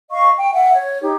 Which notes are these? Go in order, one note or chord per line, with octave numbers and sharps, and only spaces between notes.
D#5 F5 C#6
G5
E5 F#5
C#5
D#4 G4